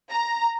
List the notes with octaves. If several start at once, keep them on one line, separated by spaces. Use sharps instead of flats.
A#5